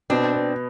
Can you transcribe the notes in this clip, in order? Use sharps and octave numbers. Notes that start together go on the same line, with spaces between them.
B2 C4 D4
B3